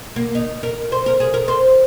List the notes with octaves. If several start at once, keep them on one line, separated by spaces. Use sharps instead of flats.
A#3
D#4
A#4
C5
A#4
G#4
A#4
C5